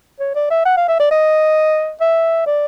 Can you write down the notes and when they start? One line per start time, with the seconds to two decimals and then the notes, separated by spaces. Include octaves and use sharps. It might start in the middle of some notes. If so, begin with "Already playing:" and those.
0.20 C#5
0.36 D5
0.51 E5
0.66 F#5
0.77 F5
0.89 E5
1.00 D5
1.11 D#5
2.01 E5
2.47 D5